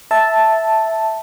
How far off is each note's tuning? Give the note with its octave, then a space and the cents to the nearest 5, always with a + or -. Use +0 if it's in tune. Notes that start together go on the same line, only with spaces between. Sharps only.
E5 -5 A5 +0